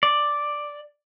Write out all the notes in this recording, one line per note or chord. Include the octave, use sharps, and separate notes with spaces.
D5